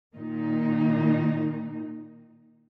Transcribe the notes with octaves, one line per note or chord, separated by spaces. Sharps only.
A#2 D#3 D#4